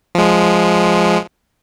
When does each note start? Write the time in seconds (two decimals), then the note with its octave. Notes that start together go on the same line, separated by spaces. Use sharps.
0.15 F3 G#3